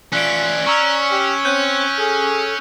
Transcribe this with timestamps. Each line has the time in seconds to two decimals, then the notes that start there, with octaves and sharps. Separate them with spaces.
0.13 E3 C#4 F4 D5 F#6 B6 D7
0.67 C#4 A#5 C#6 E6 F6
1.11 G4
1.45 C4 C#5 F#6 G6 D#7
1.98 G#4 A4